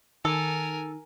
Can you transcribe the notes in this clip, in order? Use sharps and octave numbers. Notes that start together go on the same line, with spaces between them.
D#3 A4 A#4 G#5